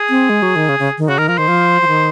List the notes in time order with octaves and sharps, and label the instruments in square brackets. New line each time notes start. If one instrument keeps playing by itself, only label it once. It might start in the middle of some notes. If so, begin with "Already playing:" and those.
Already playing: [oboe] G#4
[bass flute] C4
G#3
F#3
D#3
C#3
C#3
D#3
[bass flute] C#3 [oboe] F#4
[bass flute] D#3 [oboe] A#4
[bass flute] F3 [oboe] A#4
[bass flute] D#3 [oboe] C5
[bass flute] F3
F3
D#3